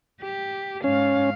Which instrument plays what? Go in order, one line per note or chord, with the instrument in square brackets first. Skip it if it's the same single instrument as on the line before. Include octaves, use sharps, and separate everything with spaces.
[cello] G4
[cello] G#2 F5 [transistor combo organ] C#4